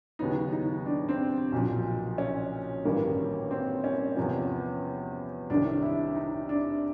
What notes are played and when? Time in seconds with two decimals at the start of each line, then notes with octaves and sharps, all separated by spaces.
0.19 D#2 C#3 F#3 B3 D#4
0.52 D#4
0.86 D4
1.09 C4
1.52 B1 A#2 F3
2.18 C#4
2.85 A1 G2 D#3 G3 A#3
3.51 C4
3.84 C#4
4.16 E2 C3 F3 C#4
5.50 C2 C3 D#3 D4
5.83 E4
6.15 D#4
6.49 D4